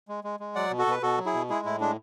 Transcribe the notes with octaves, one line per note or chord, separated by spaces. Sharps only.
G#3
G#3
G#3
F#3 D5 F#5
B2
F#4 A4
B2 B4
B2 F#4 A4
F#3
E4 G#4
B2
G#3 E4 G#4
A2 E4
G#3 D4